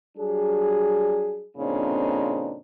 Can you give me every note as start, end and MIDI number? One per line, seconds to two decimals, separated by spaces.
0.18 1.46 54
0.18 1.46 55
0.18 1.46 62
0.18 1.46 68
1.57 2.57 41
1.57 2.57 46
1.57 2.57 49
1.57 2.57 60
1.57 2.57 62
1.57 2.57 63